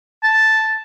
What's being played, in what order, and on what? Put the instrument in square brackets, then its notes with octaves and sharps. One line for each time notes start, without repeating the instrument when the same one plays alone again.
[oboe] A5